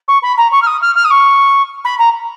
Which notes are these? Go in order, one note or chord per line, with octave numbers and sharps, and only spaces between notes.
C#6
B5
A#5
C#6
F6
D#6
F6
F6
D#6
C#6
B5
A#5